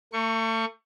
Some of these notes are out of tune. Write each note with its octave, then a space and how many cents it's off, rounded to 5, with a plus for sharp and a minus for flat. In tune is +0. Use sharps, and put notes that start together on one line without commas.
A3 +40 C#6 +0